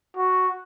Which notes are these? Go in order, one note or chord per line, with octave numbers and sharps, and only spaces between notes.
F#4